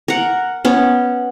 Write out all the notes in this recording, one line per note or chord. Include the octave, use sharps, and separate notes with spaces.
A#4 F#5
B3 C#4